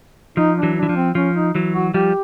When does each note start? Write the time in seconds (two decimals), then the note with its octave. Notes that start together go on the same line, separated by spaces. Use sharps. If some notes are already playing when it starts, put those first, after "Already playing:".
0.37 F3 D#4
0.57 D4
0.63 E3 F#3
0.77 D4
0.83 E3
0.89 F3
0.96 C4
1.15 F3 C#4
1.36 D#4
1.55 E3 F#3
1.74 F#4
1.94 F3 G3 G4